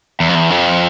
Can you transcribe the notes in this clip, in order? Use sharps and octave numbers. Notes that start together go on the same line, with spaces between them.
E2
F2
E2
F2